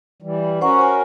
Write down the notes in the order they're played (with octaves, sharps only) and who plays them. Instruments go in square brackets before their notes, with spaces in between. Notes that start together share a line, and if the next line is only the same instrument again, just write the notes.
[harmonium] E3 G3
[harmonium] C#4 F#4 A#4 [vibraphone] C5 F#5 C#6
[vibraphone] C5 G#5